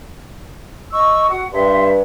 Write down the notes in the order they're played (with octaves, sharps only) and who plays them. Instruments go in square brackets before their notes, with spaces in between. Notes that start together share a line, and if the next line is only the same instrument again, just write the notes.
[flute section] D#5 C#6 E6
F#4 F#5
[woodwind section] G2 [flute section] E5 C6